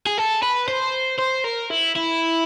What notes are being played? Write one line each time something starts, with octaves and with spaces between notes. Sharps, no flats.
G#4
A4
B4
C5
C5
A#4
E4
E4